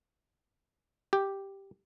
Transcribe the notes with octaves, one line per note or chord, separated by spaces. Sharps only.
G4